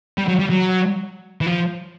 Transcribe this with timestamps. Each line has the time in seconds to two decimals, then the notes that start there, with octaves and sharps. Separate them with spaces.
0.18 G3
0.28 F#3
0.39 G3
0.50 F#3
1.41 E3
1.46 F3